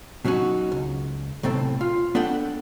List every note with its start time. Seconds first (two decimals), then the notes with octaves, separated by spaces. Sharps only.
0.25 B2 F#3 C#4 D#4 F#4
0.72 C#2
1.43 B1 A2 C3 C4 A4
1.81 F4
2.15 B3 D4 A4 F#5 G5